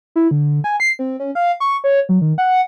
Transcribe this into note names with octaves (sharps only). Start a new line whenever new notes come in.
E4
D3
G#5
C7
C4
C#4
F5
C#6
C#5
F#3
D#3
F#5